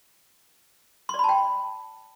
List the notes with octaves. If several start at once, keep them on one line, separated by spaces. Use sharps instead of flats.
D5 G5 A5 B5 C6